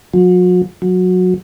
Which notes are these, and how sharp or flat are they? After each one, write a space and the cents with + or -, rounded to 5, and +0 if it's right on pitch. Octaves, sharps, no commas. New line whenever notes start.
F#3 -40
F#3 -20